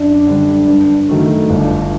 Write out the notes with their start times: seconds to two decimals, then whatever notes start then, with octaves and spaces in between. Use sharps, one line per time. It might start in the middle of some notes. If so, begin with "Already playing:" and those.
Already playing: F#2 D4
0.27 D3 G3
0.68 G2
1.09 D#3 F#3 A3
1.49 G1 D4